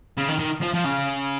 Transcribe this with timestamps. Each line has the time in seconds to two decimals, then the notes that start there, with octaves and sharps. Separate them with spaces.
0.18 C#3
0.29 D#3
0.40 D#3
0.63 F3
0.75 F3
0.86 C#3